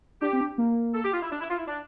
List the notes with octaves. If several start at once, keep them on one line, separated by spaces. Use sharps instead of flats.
D4 G4
C4
D4
A#3
A4
G4
F4
E4
D4
E4
F4
E4
D4